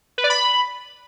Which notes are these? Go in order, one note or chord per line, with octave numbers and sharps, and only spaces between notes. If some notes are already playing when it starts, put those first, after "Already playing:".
B4
D5
B5